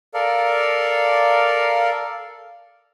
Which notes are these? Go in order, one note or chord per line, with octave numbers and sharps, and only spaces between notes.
A4 A#4 D5 F5